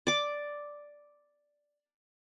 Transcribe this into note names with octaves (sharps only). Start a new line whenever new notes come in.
D5 D6